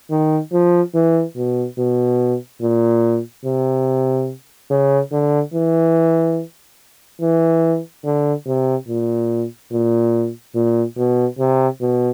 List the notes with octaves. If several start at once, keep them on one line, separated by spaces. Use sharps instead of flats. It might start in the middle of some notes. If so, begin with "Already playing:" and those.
D#3
F3
E3
B2
B2
A#2
C3
C#3
D3
E3
E3
D3
C3
A#2
A#2
A#2
B2
C3
B2